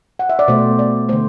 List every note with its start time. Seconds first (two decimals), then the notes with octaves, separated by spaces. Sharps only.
0.19 F#5
0.29 E5
0.39 D5
0.48 B2 A3 C5
0.79 D5
1.09 D3 A3 C5